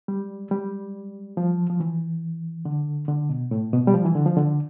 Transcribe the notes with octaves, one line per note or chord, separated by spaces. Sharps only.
G3
G3
F3
F3
E3
D3
D3
B2
A2
B2
G3
F3
E3
D3
F3
D3